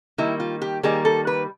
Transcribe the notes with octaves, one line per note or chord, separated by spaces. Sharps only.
D#3 G3 A#3 E4
F4
G4
D#3 G3 A#3 G#4
A4
B4